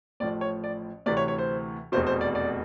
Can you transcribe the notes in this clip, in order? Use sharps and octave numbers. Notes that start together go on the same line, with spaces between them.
A1 A2 F3 D5
C#5
D5
D2 C3 E3 D5
C#5
C#5
C5
F1 E2 B2 C5
C5
D5
D5